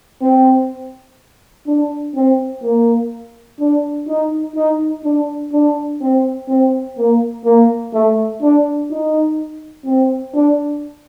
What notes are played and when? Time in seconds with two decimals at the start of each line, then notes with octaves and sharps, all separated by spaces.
0.22 C4
1.67 D4
2.15 C4
2.62 A#3
3.60 D4
4.08 D#4
4.55 D#4
5.04 D4
5.52 D4
6.01 C4
6.48 C4
6.98 A#3
7.45 A#3
7.94 A3
8.42 D4
8.90 D#4
9.86 C4
10.34 D4